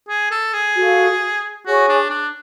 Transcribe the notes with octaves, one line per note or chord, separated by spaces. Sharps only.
G#4
A4
G#4
F#4 A4 F5
F#4 G#4 C#5 G#5 C#6
D4
D4